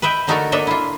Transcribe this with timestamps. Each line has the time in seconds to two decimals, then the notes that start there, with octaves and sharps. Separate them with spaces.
0.02 B4 D#5 E5 G5
0.27 D3 A3 D#4 F#4 A4 A#4
0.52 A#3 D4 A4 D#5 E5
0.67 E4 F4